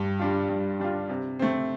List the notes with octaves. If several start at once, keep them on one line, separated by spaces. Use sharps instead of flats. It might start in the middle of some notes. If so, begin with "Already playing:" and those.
Already playing: G2
G3 D4 F4
G2
G3 D4 F4
C3
A3 C4